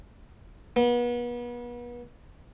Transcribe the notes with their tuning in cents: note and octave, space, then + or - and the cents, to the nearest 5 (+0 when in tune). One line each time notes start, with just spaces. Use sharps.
B3 -35